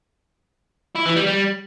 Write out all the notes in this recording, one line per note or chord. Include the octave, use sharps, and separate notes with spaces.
E4
E3
G3
G3